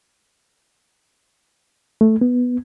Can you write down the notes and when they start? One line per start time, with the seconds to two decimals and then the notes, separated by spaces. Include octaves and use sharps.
2.01 A3
2.21 B3